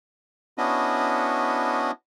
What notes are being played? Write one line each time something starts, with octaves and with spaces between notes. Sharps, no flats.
B3 C#4 D4 E4 F#4 D#5